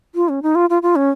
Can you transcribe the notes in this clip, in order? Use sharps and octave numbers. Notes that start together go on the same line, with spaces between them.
F4
C#4
D#4
F4
F4
F4
C#4